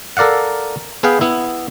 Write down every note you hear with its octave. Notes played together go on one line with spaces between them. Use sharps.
A4 A#4 D5 F5 F#5
B3 G#4 B4 F5 G5
B3 E4